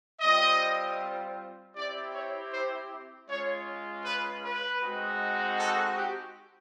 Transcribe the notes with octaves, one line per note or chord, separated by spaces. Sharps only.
G3 C4 F4 D#5
C4 E4 G4 D5
C#5
C5
G#3 C#4 F4 C#5
B4
B4
G#3 C4 D#4 F#4
A4
G4